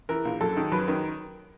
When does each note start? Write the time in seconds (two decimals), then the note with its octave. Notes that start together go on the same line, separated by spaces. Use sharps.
0.09 E3 A#4
0.25 A#1
0.41 F#2 A4
0.57 D#3
0.72 F#2 B4
0.88 D#3 A#4